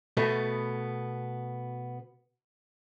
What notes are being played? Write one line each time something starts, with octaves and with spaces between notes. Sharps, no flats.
B2 A3 B3